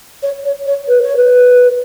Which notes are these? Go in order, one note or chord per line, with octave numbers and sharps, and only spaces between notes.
C#5
C#5
C#5
B4
C#5
B4